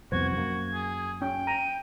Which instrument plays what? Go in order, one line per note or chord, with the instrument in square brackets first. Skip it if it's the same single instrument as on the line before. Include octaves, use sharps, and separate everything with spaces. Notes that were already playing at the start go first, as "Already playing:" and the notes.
[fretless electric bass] C2 F2 B3 [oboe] F#4 [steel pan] C5 [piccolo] G#6
[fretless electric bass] F#2 A#3 [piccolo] G#6
[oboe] G#4
[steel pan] C#4 [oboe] G5
[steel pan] A#5 [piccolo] D#7